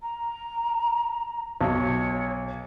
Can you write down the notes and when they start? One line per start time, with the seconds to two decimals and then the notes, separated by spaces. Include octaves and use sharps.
0.02 A#5
1.61 B1 C#5